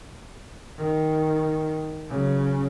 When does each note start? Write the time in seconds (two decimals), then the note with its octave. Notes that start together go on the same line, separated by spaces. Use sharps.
0.78 D#3
2.09 C#3 F#3